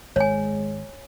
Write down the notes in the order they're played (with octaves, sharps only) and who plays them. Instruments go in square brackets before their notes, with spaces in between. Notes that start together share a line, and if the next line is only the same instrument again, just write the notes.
[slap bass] G#1 [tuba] G#3 [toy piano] C#5 G#5